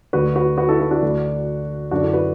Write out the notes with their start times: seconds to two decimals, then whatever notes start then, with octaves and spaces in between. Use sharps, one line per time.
0.13 D2 D3 F#4 B4
0.36 F#4 B4
0.58 F#4 B4
0.69 E4 A4
0.80 E4 A4
0.91 D4 F#4
1.02 D2 D3
1.91 F#2 D4 F#4
1.96 D3
2.02 E4 A4
2.13 F#4 B4